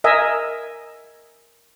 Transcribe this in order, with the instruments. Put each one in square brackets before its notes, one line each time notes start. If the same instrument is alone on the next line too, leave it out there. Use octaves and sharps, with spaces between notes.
[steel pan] A#4 D#5 E5 G#5